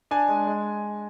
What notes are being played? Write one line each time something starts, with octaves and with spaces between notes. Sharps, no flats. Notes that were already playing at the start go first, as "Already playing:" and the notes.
D4 G#5
G#3
G#3